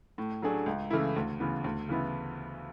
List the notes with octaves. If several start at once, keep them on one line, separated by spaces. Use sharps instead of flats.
A2
F#3 A3 D4 G#4
C#2
C#3 E3 A3 E4
D2
C#3 E3 B3
D2
C#3 E3 B3 E4